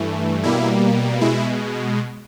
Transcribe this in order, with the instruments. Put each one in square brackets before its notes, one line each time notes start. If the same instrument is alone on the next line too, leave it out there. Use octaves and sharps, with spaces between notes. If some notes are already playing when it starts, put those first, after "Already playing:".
Already playing: [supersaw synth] G2 E3 A3
B2 G3 A#3 E4
B2 G#3 E4